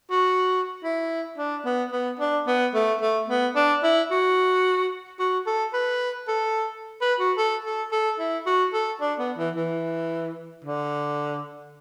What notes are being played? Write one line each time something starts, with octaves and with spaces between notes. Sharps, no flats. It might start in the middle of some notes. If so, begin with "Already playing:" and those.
F#4
E4
D4
B3
B3
D4
B3
A3
A3
B3
D4
E4
F#4
F#4
A4
B4
A4
B4
F#4
A4
A4
A4
E4
F#4
A4
D4
B3
E3
E3
D3